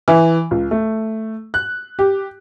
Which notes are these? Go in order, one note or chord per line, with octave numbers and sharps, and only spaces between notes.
E3
C#2
A3
F#6
G4